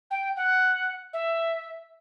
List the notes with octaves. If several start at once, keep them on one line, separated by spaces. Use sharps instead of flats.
G5
F#5
E5